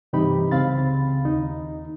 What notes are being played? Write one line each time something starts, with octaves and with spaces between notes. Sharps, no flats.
G2 C3 E3 D#4 G4 B5
C#2 C#3 C4 F5 B5 A6
D#2 D#4